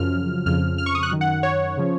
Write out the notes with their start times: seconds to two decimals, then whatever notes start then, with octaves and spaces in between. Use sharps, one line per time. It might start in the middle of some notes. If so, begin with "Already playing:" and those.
Already playing: F#2 C#3 F3 F6
0.46 F2 C#3 F3 F6
0.78 F6
0.86 C#6
0.95 D#6
1.03 F#6
1.11 F#2 D#3
1.21 F#5
1.43 C#5
1.77 C#3 F3